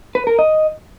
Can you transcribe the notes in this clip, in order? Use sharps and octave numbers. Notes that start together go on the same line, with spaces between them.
B4
A#4
D#5